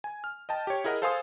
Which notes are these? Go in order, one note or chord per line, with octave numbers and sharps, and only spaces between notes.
G#5
F6
D#5 G5 A5
G4 C#5
E4 G#4 A#4 D#5 F#5
A4 C5 F5 G#5 C6 D#6